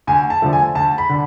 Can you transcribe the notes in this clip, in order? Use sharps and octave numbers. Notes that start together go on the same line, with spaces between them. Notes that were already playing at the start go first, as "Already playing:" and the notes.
D2 G#5
A5
D3 F3 A3
G#5
D2 A5
B5
D3